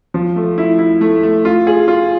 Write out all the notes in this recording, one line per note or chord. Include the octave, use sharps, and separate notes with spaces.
F3
A3
E4
E4
A3
A3
F4
G#4
F4